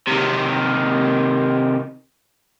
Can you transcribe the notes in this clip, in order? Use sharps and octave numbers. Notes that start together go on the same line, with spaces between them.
C3 D#3